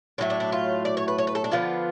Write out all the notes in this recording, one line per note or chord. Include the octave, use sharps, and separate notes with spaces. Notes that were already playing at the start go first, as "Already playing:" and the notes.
A2 F#3 A3 D4
D4
D4
F4
D5
C#5
B4
C#5
B4
A4
D4
D3 F3 B3 F4